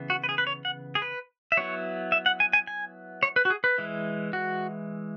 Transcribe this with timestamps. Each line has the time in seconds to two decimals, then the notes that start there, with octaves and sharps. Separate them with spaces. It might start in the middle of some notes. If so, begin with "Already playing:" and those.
Already playing: C#3 E3 B3
0.10 F#4
0.24 B4
0.29 G#4
0.38 B4
0.47 C#5
0.65 F#5
0.95 G#4
1.02 B4
1.52 E5
1.57 F#3 B3 E4 C#5
2.12 E5
2.26 F#5
2.40 G#5
2.53 G#5
2.67 G#5
3.23 C#5
3.36 B4
3.45 F#4
3.50 G#4
3.64 B4
3.78 E3 G#3 E4
4.33 F#4